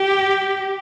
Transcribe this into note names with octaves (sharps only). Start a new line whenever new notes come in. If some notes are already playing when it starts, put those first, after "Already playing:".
Already playing: G4